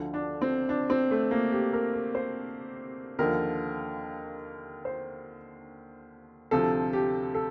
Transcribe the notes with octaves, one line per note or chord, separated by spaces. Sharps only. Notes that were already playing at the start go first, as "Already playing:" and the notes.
Already playing: D2 D3 F3
D4
C4
D4
C4
A3
A#3
G4
A#4
A#4
C5
D#2 D3 F3 A#4
C5
D2 C3 F3 A4
G4
A4